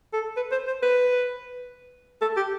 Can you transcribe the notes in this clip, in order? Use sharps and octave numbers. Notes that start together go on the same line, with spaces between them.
A4
B4
C5
C5
B4
A4
G4